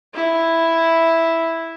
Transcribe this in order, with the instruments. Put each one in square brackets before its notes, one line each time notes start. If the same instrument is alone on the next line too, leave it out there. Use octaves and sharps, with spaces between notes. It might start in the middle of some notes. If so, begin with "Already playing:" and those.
[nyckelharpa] E4